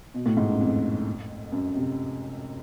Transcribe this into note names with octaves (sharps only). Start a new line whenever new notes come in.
B2
A2
G#2
F#2
F2
F#2
C3